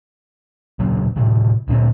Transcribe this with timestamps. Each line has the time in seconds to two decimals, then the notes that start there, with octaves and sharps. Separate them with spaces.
0.79 D#1 C#3 F#3 A#3
1.16 A2 C3 E3
1.68 D2 A#2 B3 C4